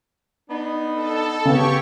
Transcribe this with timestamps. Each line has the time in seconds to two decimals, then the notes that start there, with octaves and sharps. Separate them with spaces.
0.49 B3 D4 D#4
0.94 A4
1.45 C#3 B3 G4 C#5 C#6